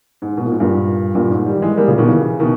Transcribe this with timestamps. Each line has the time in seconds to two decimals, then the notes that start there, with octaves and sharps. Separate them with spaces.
0.22 G#2
0.37 B2
0.45 A#2
0.52 G#2
0.60 G2 A#2
1.15 G2 A#2
1.30 G#2
1.46 D#3 G3
1.62 E3 G#3
1.77 G3 A#3
1.88 A#2 C#3
1.98 B2 D#3
2.08 C#3 E3
2.39 B2 D#3